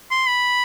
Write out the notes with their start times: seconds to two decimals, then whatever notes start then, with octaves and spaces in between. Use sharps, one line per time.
0.11 C6
0.27 B5